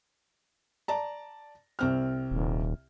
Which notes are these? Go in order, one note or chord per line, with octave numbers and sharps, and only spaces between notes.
D5 A5 A#5
C2 C4 F6
D#1